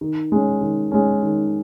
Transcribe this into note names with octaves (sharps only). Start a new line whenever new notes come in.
D#3
G#3 C#4
D#3
G#3 C#4
D#3